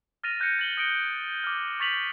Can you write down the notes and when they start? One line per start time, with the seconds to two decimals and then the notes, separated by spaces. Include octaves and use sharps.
0.24 F6 A6 A#6 D#7 F7
0.40 F#6 G6 A6 A#6 C#7 D#7
0.59 A6 F#7 G7
0.77 D#6 A#6 C#7 D7 G7
1.44 D6 F6
1.80 C#6 A6 B6 F7 F#7